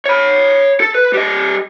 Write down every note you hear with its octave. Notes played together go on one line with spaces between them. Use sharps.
C#5 B5
A4
B4
G3 D#5